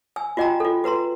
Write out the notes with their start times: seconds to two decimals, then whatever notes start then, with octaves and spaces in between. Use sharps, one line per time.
0.16 G#5 E6
0.37 F4 F#4 D#5 G5 G#5 A#5
0.60 F4 A4
0.84 F#4 B4 A#5 C6